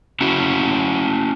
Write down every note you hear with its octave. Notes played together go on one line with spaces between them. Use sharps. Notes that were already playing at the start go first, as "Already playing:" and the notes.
C#4 E4 F#4